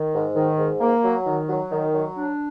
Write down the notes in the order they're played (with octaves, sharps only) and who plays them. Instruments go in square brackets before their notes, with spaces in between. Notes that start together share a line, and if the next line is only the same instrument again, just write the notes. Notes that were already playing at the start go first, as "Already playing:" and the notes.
Already playing: [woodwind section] D#3
G#2
D#3
G#2
A#3
F#3
D#3
F#3
D#3
F#3
D4